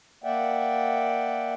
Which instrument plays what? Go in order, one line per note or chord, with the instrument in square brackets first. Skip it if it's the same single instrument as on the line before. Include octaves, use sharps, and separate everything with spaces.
[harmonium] A#3 D5 E5 F#5 G5